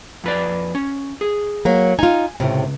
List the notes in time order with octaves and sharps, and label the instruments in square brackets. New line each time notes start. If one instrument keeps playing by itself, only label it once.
[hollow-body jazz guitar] F2 B4 D5
C#4
G#4
[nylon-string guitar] F#3 A#3
[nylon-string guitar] D#4 F4 [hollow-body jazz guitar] G#5
[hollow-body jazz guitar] C#2 [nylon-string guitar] A2 C3